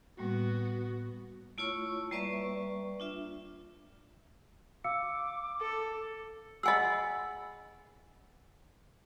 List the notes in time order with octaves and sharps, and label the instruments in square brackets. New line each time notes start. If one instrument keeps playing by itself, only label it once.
[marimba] A2 G3 A#3 [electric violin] B3 F#4
[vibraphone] A3 E4 F4 C#5 C#6
G3 A#3 B4 D5 E5 C#6
D4 F4 E5
[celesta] F5 E6 C#7 [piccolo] D6
[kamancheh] A4
[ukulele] G#4 F#5 B5 [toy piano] D#5 G#5 E6